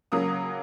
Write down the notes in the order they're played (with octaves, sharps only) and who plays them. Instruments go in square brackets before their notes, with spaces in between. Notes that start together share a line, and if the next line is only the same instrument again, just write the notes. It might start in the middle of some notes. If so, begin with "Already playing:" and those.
[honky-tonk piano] C#3 F#3 A#3 D#6